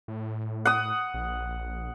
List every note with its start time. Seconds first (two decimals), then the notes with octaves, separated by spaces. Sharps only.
0.08 A2
0.65 F#5 D#6
1.14 A#1